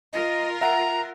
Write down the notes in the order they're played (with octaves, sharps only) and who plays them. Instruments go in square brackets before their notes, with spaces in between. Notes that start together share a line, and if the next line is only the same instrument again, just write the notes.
[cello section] F4 A#4 [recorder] D#5
[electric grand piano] E5 F#5 [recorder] A#5